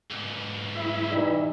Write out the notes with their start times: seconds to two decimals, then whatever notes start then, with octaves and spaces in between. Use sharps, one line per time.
0.11 B1 G#2
0.75 E4 E5
1.11 E3 G3 D#4